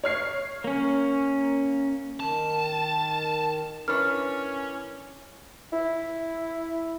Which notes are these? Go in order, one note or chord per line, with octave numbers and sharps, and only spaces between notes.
C#5 F6 C7
A#3 C#4
D#3 A5
C#4 D4 E4 A#4 B4 C#5 F6
E4